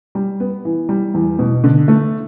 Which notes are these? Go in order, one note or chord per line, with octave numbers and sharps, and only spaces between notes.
G3
B3
E3
G3
E2
B2
D3
A3